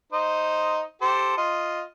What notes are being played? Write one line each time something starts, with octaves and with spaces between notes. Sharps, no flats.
D#4 C5 D#5
G4 A4 C5
F4 D#5 C6